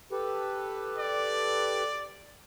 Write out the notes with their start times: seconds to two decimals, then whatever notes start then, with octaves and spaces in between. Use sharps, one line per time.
0.11 G4 A4 B4
0.98 D5